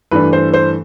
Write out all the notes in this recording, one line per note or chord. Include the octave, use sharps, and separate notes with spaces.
G2 E3 A3 D4 B4
C5
C5